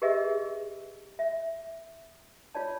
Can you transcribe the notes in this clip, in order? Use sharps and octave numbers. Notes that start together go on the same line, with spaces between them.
G4 G#4 A#4 B4 D#5 E5
E5
F4 C#5 D5 A5